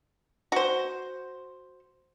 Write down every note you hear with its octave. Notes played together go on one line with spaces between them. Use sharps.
F#4 C5